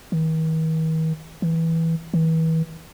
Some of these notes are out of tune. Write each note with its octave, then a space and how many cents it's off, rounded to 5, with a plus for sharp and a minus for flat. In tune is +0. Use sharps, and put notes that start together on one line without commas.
D#3 +45
E3 -10
E3 -35